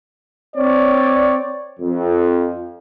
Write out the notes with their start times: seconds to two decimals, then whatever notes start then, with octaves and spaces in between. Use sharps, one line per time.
0.56 C4 C#5 D5
1.80 F2